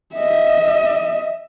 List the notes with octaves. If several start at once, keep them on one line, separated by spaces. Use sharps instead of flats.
D#5 E5